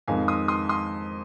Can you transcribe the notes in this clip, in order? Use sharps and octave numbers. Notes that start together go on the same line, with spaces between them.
F2 D#3 G#3 F5 G#5
C6 D#6
C6 D#6
C6 D#6